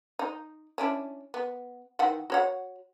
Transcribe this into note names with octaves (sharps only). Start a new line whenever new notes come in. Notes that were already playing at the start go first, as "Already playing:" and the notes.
D#4
C#4 D4 E4
B3
D#3 E3 F#5
F#4 C#5 F#5